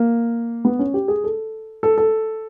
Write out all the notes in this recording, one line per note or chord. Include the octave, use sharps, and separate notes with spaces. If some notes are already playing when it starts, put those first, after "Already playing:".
Already playing: A#3
B3
C#4
G4
G#4
A4
A4
A4